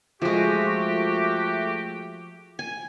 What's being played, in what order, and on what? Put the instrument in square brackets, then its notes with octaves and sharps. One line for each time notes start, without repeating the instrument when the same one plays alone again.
[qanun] F3 G#3 [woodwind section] A3 F#4 G4
[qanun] G#5